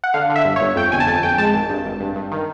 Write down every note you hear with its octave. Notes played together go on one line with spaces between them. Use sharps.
F#5
D3 F5
D3
E5
G1
G1 C#5
F2 G5
G1 G#5
A5
F2 G#5
F2 G5
G#3 A5
G#1
G2
G#1
G2
G2
D#3